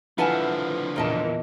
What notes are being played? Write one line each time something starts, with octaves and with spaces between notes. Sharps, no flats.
D3 F3 E4 F4 B4 F#5 G#5 A5
E2 A#2 E3 A#4 D#5 A5